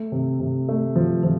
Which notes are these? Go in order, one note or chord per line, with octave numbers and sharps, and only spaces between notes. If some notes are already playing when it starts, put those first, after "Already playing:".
Already playing: A3
C3
C3
A3
F3
F3